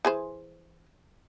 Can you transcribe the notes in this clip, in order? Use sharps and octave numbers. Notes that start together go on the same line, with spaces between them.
E3 G#4 C5